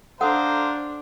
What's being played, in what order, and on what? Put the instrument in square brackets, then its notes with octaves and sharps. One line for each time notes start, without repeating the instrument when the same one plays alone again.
[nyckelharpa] D4 [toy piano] A4 F#5 [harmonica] C5 F5 A#5